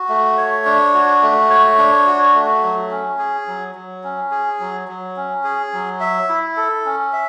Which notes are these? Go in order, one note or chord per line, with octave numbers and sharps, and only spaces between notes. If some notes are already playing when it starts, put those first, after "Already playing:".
Already playing: F#4
A3
C#5
D4
F#4
A3
C#5
D4
F#4
A3
F#3
C#4
G#4
F#3
F#3
C#4
G#4
F#3
F#3
C#4
G#4
F#3
E5
E4
A4
C#4
E5